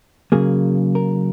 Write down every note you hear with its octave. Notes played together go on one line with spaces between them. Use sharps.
C#3 F#3 A#3 G#4
A#4